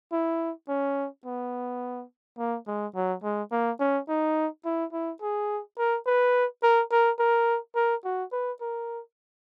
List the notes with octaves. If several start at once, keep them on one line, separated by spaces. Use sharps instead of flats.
E4
C#4
B3
A#3
G#3
F#3
G#3
A#3
C#4
D#4
E4
E4
G#4
A#4
B4
A#4
A#4
A#4
A#4
F#4
B4
A#4